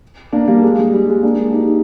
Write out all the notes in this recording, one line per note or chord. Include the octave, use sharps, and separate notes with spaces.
A#3 D4
G3 A#3
G#3
G3
G3
G#3
A#3 D4
G#3
D#4 G4